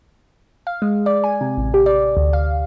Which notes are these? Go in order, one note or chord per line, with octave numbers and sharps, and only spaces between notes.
F5
G#3
D5
G#5
C3
A1
G4
D5
D2
F5